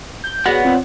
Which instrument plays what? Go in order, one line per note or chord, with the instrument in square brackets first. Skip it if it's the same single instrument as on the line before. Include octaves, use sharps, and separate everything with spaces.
[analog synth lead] G6
[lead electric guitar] B3 [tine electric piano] F#4 G#4 [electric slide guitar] C#5 D5 F#5 [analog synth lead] A#6
[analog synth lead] C4 [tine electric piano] F4